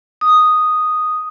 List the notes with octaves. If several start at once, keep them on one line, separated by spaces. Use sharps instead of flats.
D#6